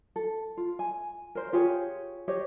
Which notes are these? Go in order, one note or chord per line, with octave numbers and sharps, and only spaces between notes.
A4
F4
G#5
A#4 C5
F4 G4 G#4 C#5
G4 C5 C#5 D#5